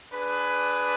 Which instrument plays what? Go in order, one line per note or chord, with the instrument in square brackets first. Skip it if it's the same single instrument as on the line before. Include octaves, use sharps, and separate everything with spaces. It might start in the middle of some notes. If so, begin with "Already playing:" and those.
[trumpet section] D4 G#4 B4